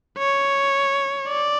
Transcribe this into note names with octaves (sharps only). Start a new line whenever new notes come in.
C#5
D5